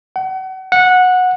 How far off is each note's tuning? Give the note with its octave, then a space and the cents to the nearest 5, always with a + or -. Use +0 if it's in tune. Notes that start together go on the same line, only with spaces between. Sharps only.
F#5 +35
F#5 -15